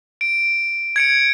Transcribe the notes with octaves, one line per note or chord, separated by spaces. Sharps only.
D7
G#6 C#7 D7